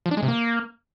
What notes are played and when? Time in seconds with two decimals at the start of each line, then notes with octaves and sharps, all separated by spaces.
0.06 F3
0.11 D4
0.17 G#3
0.23 C3
0.28 A#3